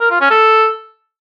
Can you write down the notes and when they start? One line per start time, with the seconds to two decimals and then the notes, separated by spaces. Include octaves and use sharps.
0.01 A#4
0.11 F4
0.21 C#4
0.30 A4